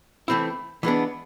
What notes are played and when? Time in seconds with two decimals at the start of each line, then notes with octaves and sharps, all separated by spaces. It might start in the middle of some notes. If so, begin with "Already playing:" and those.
0.28 E3 A3 C4 E4
0.83 E3 G#3 B3 D4